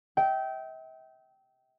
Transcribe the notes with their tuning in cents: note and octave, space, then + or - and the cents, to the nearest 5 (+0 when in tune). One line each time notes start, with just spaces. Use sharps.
E5 -40 G5 -20